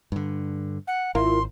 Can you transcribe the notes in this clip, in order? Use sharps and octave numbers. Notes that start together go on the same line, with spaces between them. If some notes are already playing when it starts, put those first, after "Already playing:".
G2 D3
F#5
G#1 E4 F4 A#4 C6